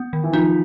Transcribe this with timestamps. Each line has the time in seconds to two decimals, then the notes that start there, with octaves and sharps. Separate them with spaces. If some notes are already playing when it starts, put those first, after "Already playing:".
Already playing: B3
0.13 D#3
0.24 E3
0.33 F3 D#4